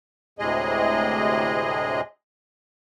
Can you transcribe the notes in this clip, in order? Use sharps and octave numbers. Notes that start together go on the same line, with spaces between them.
D2 A2 C3 G#3 G#4 D#5